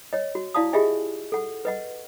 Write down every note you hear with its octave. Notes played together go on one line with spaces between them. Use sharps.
C#5 D#5
F#4
E4 D5 F5 A5 D#6
F4 G4 G#4 D#5 E5 G#5
A4 F#5
B4 D#5 F#5